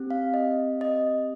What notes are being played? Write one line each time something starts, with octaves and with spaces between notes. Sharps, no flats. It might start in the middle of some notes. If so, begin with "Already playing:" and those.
Already playing: C4 G4
F5
D#5
D#5